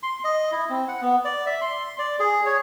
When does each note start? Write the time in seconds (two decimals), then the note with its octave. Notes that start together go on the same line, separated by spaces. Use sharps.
0.03 C6
0.24 D#5
0.52 E4
0.69 C4
0.88 F#5
1.01 B3
1.25 D5
1.46 E5
1.61 C6
1.99 D5
2.20 G#4
2.46 C#5